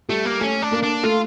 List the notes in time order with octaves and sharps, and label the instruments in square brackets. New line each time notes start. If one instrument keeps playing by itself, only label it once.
[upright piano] G3 G4 [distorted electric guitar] A3
[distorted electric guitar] A#3
[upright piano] A3 A4 [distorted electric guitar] C#4
[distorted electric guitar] D4
[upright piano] A#3 A#4
[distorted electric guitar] D4
[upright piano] A3 A4 [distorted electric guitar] F4